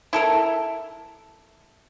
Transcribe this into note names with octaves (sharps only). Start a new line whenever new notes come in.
E4 A4 A#4